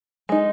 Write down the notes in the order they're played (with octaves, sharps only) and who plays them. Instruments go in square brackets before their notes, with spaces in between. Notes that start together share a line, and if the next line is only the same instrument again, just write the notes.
[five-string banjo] G#3 D#4